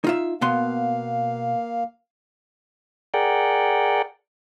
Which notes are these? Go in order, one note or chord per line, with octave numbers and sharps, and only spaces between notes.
D#4 F4 E5
B2 A#3 B3 F5 C6
G#4 A#4 D5 F#5 G5